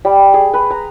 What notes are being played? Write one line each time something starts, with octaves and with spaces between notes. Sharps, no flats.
G3
G#4
B4
A#5